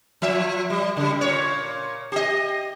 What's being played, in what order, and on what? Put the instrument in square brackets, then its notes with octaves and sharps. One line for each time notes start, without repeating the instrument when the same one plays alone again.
[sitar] F3 E5
G3
C#3 G3
A#2 C#5
G4 D#5